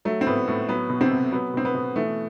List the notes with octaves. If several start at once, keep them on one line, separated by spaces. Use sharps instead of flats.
F#3 A3
C4
A2 B3
A2 A3
F#3 B3
B2
C3 C4
B2
F#3 B3
B2 C4
B3
B2
E3 A3